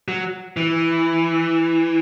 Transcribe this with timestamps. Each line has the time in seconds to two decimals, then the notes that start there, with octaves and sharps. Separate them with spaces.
0.08 F#3
0.57 E3